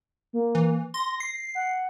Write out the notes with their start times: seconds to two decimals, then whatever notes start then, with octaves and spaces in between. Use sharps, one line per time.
0.33 A#3
0.55 E3
0.94 C6 A#6
1.20 C7
1.55 F#5